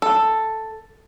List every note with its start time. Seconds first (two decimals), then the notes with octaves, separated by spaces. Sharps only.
0.02 A4